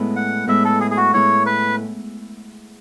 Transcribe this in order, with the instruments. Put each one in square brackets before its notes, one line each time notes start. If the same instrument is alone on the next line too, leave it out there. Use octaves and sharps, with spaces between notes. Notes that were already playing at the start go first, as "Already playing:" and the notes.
Already playing: [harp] A2 G#3 B3 E4
[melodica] F#5
[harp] A2 G#3 B3 E4 [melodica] E5
[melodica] A4
G#4
G#4
F#4
[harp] A2 G#3 B3 E4 [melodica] C#5
[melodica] B4